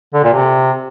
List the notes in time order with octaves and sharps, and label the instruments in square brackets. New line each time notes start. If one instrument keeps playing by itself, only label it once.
[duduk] D3
A#2
C3